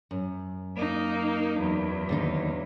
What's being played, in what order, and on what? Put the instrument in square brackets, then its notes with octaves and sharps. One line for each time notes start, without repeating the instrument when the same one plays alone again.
[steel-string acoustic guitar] F#2
[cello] A#3 D#4
E2 F#3
[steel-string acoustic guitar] D#2 D3 D#4